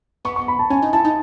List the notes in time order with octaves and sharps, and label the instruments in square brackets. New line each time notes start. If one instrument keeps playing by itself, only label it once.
[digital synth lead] B3 [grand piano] C#6
[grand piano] C#6
B5
A5
[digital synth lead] C#4 [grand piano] G#5
[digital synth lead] D#4
[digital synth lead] E4 [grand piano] A5
[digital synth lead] D#4